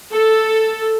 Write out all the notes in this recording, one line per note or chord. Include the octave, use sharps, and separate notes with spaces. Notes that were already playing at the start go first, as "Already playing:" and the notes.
A4